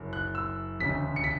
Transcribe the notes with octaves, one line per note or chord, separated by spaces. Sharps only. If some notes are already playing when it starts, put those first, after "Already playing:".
Already playing: F#1 F#2 F#3
F#6
E6
E1 D2 C#3 B6
C#7
B6